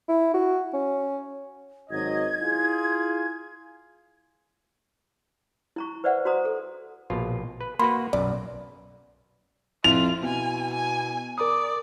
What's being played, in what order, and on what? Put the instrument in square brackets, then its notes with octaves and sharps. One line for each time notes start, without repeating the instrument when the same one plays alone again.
[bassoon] E4
F#4
C#4
[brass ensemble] G#1 F#3 D#5 [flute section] G#6
[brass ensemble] E4 F4 G#4
[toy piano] E4 A#5 C#6
B4 C5 D5 E5 F#5
F#4 C5 A#5 D#6
A4
[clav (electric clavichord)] A#1 B2 F4
B4
[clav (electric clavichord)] A#3 F#4 B4 [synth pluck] B5 C6
[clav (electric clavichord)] B1 F#2 [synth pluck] D5
[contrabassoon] F2 [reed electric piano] E4 [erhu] F4 [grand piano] F7
[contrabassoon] B2 [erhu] G#5
[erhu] G#5
[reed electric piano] A#4 D#6 [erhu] D5